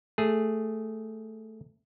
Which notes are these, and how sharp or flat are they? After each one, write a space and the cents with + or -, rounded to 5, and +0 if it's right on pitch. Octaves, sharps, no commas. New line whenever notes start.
A3 +0 G#4 +0